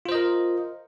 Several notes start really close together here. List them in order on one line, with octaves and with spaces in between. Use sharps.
F4 C5 D#5 A#4